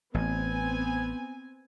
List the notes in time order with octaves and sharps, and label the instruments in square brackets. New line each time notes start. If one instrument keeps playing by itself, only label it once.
[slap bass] A1 [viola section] B3 C4 G#5